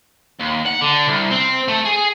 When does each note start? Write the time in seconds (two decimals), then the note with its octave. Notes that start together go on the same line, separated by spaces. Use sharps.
0.40 D#2
0.66 F#5
0.82 D3
1.08 C2
1.31 C4
1.68 A3
1.85 G#4